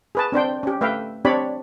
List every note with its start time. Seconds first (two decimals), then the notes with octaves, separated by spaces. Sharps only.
0.15 G#4 B4 A5
0.32 C4 D4 C5 G5
0.63 C#4 G4
0.81 A3 B4 E5 F5 G5
1.25 C4 D4 G4 C#5 D5 B5